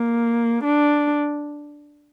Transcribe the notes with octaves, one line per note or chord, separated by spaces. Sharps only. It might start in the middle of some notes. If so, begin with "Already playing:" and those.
Already playing: A#3
D4